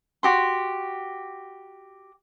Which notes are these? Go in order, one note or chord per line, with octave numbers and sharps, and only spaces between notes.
F#4 G4 C6